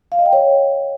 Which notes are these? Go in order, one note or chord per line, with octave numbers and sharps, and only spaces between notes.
F5
D#5
G5
C#5